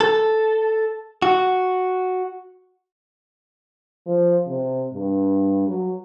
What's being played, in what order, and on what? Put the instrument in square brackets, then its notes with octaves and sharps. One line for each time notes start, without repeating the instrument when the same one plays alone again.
[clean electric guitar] A4
F#4
[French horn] F3
C3
G2
F#3